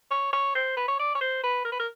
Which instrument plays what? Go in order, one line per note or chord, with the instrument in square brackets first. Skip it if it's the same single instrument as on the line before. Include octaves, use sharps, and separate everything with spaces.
[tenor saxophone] C#5
C#5
C5
B4
C#5
D5
C#5
C5
B4
A#4
B4
A#4